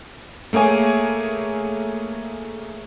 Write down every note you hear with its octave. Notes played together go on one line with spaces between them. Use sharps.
A3 A#3 G#4 C#5 G#5